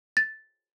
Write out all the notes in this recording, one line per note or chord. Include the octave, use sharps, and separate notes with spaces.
A6